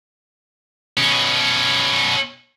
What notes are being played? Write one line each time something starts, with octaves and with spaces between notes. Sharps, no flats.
B2 C#4